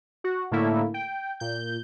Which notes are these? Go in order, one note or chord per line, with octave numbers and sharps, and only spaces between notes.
F#4
A2 D3 A3 A#3 E4
G5
A#2 G6